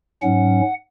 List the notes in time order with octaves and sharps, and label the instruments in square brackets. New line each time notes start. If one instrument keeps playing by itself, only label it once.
[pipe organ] G#2 F#3 C#4 F#5